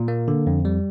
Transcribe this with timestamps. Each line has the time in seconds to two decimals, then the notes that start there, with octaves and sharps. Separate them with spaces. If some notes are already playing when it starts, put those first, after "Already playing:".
Already playing: A#2
0.08 A#3
0.28 D3
0.47 F2
0.65 G3